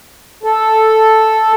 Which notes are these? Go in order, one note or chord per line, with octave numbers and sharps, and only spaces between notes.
A4